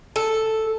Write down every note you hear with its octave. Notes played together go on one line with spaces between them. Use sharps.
A4